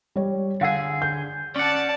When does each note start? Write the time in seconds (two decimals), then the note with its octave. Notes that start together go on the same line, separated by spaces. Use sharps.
0.16 G3 C#5
0.61 D3 G#4 F5 F#5 E6
1.02 G6
1.56 C#4 D5 F#5 A5